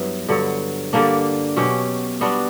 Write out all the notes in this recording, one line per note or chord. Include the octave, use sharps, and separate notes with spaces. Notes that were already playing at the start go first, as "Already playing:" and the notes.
Already playing: G2 F#3 B3 E4
G2 D3 F#3
D3 G3 A#3 D4
B2 F#3 C#4 G4
G3 B3 D4 F#4